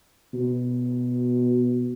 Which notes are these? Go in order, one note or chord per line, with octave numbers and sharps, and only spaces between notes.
B2